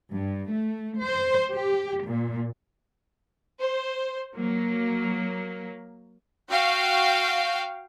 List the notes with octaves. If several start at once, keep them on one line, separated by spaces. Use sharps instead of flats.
G2
A3
C5
G4
A#2
C5
F#3 A#3
F#4 F5 G5